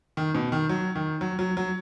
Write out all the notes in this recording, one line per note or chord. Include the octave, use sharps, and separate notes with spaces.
D#3
B2
D#3
F#3
D#3
F#3
F#3
F#3